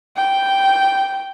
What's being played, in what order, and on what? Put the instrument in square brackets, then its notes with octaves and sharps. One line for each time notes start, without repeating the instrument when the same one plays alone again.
[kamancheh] G5